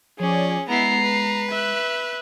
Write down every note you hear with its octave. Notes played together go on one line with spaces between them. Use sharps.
F3 C#4 G#4 C#5 D5
G#3 B3 E4 A#5 C7
B4
E5 F#6